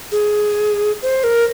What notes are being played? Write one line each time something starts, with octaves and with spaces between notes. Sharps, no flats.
G#4
C5
A#4